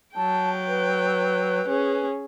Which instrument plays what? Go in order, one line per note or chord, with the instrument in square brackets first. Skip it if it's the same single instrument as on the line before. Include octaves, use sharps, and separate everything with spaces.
[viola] F#3 G5 [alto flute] A5
[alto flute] B4
[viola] C#4 G#4